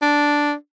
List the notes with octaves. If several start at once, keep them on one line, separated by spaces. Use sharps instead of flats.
D4